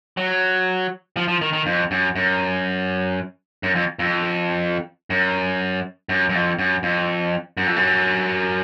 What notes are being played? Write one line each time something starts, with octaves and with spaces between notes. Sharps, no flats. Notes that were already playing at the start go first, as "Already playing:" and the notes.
F#3
F3
F3
D#3
D#3
F2
F#2
F#2
F#2
F2
F2
F#2
F#2
F#2
F2
F#2
F2
F#2
F2
F#2